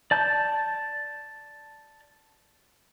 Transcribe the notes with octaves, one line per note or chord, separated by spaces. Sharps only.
D5 A5 G6